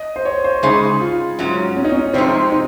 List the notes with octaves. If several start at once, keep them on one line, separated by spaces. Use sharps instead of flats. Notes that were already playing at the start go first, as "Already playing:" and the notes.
Already playing: D#5
C5
C#5
C5
C#3 G#3 D#4 G#4
F4
G#2 F#3 C#4
C#4
D#4
C#4
F2 C3 F3 G#3 C4 D#4
D#4